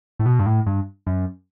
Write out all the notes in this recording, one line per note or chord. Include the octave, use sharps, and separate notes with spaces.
A2
B2
G2
A2
G2
F#2